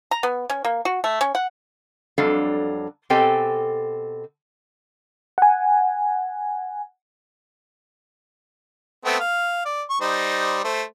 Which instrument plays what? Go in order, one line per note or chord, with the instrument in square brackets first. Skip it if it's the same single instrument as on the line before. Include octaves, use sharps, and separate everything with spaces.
[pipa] A#5
B3
C#4
A#3
F#4
A3
C#4
F#5
[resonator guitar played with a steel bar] F2 F#3 G3 D4 A4 F5
B2 C4 G4 A4 G5 G#5
[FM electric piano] F#5 G#5
[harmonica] A3 B3 C4
F5
D5
C#6
G3 D#4 C5
A3 C5